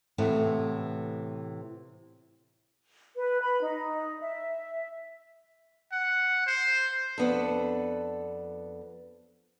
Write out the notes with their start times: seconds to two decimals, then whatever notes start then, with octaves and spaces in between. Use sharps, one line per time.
0.18 A2 C3 E3 A3 B3
3.17 B4
3.41 B5
3.61 D#4
4.21 E5
5.92 F#5
6.47 C5
7.18 F2 B3 D4 A4